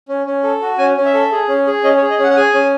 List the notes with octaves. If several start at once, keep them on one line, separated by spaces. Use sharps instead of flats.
C#4
C#4
A4
F#4
C#4 G#5
C#4
E5
A4
G#4
C#4
G#4
C#4 D#5
C#5
G#4
D#5
C#4 F#5
F#5
G#4 G#5
C#4